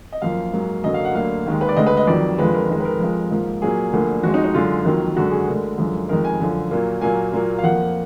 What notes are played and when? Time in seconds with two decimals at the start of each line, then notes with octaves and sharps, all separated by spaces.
0.12 D#5
0.22 F#2 F3 A#3 F5
0.53 G#2 F#3 A#3
0.84 F#2 D3 F#3 A#3 D#5
0.94 F5
1.05 F#5
1.15 D2 D3 F#3 A#3 F5
1.46 D#2 D#3 G#3
1.61 B4
1.69 D5
1.76 D2 D3 G#3 D#5
1.87 B4
1.97 D#5
2.07 F2 D#3 F#3 D5
2.39 F2 D3 F3 G#3 B4
2.54 A#4
2.69 F2 D#3 G#3 A#4
2.80 B4
2.85 A#4
3.00 F2 F3 G#3
3.31 G#2 F3 A#3
3.62 A#2 F#3 A#3 G#4
3.93 D2 D3 F3 A#3
4.23 F2 F3 G#3 F#4
4.34 D#4
4.44 D#4
4.54 F#2 D3 G#3 F4
4.85 F2 D#3 F#3 A#3
5.16 F#2 D3 G#3 F#4
5.32 G#4
5.47 D2 D3 G#3 A#4
5.78 F#2 D3 F3 G#3
6.09 F2 D#3 G#3 A#4
6.25 G#5
6.40 F#2 D3 F3
6.71 A#2 F#3 A#3
7.01 A#2 F#3 A#3 G#5
7.33 A#2 F#3 A#3
7.58 F5
7.63 F2 F3 A#3 F#5